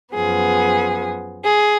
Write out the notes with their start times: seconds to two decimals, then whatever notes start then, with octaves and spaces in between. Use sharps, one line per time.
0.15 F#2 F3 B3 G#4
1.44 G#4